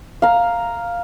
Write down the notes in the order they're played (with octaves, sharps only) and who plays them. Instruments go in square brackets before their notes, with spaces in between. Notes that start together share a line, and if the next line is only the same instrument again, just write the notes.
[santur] F5 A#5